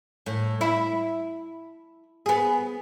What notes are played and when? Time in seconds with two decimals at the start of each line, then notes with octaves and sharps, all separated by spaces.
0.26 A2
0.61 E4
2.26 B3 G#4